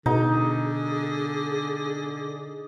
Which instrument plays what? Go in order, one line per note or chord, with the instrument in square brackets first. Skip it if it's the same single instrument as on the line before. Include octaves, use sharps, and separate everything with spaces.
[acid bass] B2 [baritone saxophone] D3 [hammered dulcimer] D#4 [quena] G#4